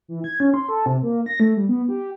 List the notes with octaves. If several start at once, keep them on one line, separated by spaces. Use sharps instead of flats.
E3
G#6
C#4
C6
A4
C3
A#3
A#6
A3
G3
B3
G4